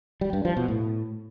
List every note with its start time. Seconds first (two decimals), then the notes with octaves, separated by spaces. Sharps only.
0.21 G3
0.33 G2
0.45 F3
0.57 B2
0.68 A2